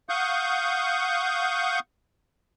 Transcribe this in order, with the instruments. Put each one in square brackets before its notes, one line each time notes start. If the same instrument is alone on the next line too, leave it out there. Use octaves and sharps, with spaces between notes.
[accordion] F5 F#5 C#6 D#6 G6